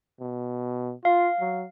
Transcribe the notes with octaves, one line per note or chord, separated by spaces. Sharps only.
B2
F4 F5
F#3